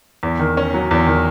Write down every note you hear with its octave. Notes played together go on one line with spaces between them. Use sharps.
E2
D#3
C#4
F#3
E2
D#3